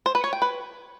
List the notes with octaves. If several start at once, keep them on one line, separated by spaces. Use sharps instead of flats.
C5
B4
C#5
G5
B4